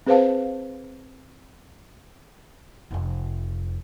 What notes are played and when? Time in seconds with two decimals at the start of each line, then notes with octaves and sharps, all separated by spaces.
0.06 C4 G#4 B4 C5 F5 A5
2.91 F1 F2